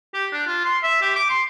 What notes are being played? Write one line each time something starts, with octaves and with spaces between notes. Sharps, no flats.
G4
D4
F4
C6
E5
G4
D6
C6